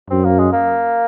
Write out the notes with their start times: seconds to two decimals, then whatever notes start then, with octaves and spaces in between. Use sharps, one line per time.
0.10 F#2 C4
0.24 A#3
0.39 G#3
0.52 A#3